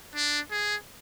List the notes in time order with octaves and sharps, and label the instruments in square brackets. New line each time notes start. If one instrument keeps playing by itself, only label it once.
[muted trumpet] D4
G#4